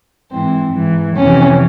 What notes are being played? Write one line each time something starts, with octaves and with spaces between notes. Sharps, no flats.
G#2 E3 C4
G#2 E3
F2 C3 E3 C#4